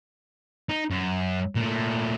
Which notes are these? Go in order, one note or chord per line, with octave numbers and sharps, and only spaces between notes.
D#4
F#2
A#2 A3